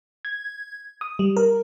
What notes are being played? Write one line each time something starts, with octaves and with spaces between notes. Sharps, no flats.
G#6
D#6
G3
A#4